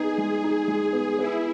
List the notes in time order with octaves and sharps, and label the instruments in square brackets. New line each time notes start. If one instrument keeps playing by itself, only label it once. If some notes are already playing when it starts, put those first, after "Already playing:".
Already playing: [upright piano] B3 D#4 [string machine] G#4
[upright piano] G#3
D#4
G#3
B3
[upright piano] B3 [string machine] E4